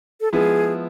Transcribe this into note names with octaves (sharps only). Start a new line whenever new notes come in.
A4
F3 G#3 B3 E4 G#4